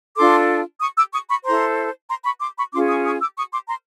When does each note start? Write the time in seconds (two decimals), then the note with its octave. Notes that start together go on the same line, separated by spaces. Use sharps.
0.16 D4 F4 A4 C6 D6
0.81 C#6 D#6
0.97 D6 E6
1.13 C#6 D#6
1.29 B5 C#6
1.45 E4 A4 C5 A#5 C6
2.09 A#5 C6
2.25 B5 C#6
2.40 C6 D6
2.56 B5 C#6
2.73 C#4 F4 G#4 C6 D6
2.88 C#6 D#6
3.05 C#6 D#6
3.21 D6 E6
3.36 C#6 D#6
3.52 C6 D6
3.68 A#5 C6